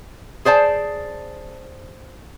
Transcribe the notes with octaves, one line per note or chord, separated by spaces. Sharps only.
G#4 C5 D5 A5